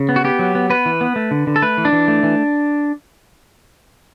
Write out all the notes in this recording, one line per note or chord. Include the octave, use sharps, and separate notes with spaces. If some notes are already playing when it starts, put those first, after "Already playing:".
Already playing: C#3
B3
F#4
B3 G4
F#3
B3
B3 B4
E3
B3
A3
D3
D3
A4
A3 B4
E3
D4
E3
A3
E3